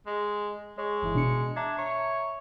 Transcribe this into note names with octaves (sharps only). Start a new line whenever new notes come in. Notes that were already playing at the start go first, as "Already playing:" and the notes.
G#3
G#3 C#5 C#6
G1 E3 E4
B2 D4 C#7
D4 E5 A#5 G#6
C#5